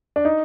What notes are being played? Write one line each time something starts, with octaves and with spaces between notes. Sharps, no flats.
D4
D#4